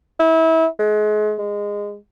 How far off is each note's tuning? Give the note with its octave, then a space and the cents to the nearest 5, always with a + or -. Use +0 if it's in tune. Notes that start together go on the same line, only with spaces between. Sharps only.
E4 -30
G#3 +35
G#3 -20